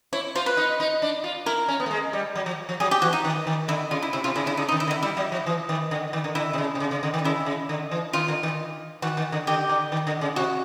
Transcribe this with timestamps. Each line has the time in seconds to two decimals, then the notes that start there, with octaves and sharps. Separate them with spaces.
0.13 E4 C#5
0.35 F4 C5
0.46 B4
0.57 D#4
0.80 D#4
1.02 D4
1.24 F4
1.46 E4 A#4
1.68 C#4
1.80 B3
1.86 A3
1.91 G#3
2.13 G3
2.35 F#3
2.46 F3
2.69 F3
2.80 F#3 G#4
2.91 G4
3.02 E3 F#4
3.13 D#4
3.25 D#3
3.47 D#3
3.68 D3 E4
3.91 C#3 F4
4.03 E4
4.13 C3 E4
4.24 C3 F4
4.36 C#3 E4
4.46 C#3 E4
4.57 C#3 D#4
4.69 D#4
4.72 D#3
4.80 E4
4.87 D3
4.91 E4
5.02 G3 E4
5.17 F#3
5.32 F3
5.46 E3
5.69 D#3
5.91 D3
6.13 D#3
6.24 D3
6.35 D3 E4
6.53 C3
6.58 C#3
6.75 C3
6.80 C#3
6.91 C#3
7.03 D3
7.14 D#3
7.24 C#3 E4
7.46 C#3
7.69 D3
7.91 E3
8.13 D#3 F4
8.28 D3
8.43 D#3
9.02 D#3 F#4
9.17 D#3
9.32 D3
9.47 D3 G4
9.69 D3
9.92 D#3
10.07 D3
10.21 C#3
10.36 C3 F#4